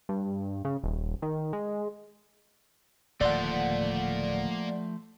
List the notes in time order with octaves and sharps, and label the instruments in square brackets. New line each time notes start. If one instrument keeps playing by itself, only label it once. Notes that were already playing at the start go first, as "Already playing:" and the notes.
[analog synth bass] G2
C#3
D#1
D#3
G#3
[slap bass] D1 D#3 [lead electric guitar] F3 A3 [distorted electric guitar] A#3 C6 [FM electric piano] D5 F#5